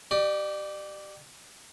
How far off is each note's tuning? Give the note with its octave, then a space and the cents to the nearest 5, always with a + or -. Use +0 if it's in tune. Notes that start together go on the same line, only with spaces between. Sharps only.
G4 -20 D5 +35